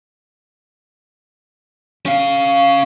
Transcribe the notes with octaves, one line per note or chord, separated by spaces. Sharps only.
C#4 F5